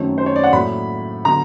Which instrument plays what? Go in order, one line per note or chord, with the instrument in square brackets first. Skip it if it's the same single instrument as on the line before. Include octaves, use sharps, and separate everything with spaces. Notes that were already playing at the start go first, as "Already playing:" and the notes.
Already playing: [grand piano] F#2 D#3 F#3 A3 C4 C#5
C5
C#5
D5
F#5
A2 F#3 A#3 B5
D3 F#3 B3 A#5